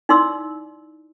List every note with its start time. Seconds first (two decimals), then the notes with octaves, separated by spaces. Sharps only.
0.09 D#4 E4 D5 C6 D6 E6